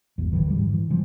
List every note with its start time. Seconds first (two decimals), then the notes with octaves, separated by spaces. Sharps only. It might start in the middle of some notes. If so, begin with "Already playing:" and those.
0.18 D#1 G#1 E2
0.32 A2 D#3 E3 F#3
0.46 D3 D#3 G3
0.58 G#2
0.74 E3
0.90 C3 E3 F3 G3